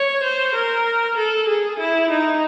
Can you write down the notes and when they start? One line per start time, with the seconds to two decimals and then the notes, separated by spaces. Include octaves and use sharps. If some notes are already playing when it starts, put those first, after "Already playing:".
Already playing: C#5
0.23 C5
0.55 A#4
1.17 A4
1.48 G#4
1.79 E4
2.10 D#4